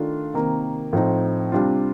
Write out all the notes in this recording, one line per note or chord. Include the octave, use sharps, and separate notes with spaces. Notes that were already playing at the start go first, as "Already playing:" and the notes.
Already playing: D#3 A3 D4 F4
C3 D#3 A#3
A2 F3 C4 D#4
C3 G3 D4 F4